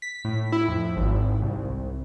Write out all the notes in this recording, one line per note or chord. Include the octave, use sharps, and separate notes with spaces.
B6
A2
E4
F2
G#1
C2